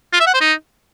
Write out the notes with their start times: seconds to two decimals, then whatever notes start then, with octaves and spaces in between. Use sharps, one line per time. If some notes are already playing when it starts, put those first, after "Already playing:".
0.13 F4
0.20 E5
0.27 F#5
0.34 C5
0.41 D#4